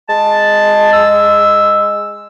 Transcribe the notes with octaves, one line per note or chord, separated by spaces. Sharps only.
G#3 A5
E6